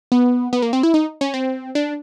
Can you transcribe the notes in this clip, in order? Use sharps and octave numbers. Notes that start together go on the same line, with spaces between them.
B3
B3
A#3
C4
E4
D#4
C#4
C4
D4